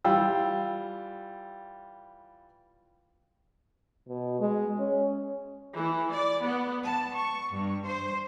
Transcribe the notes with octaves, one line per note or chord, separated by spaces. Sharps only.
E3 G3 F4 G4 E6
B2
G#3
C#4
E3
D5
B3
A5
C#6
G2
C5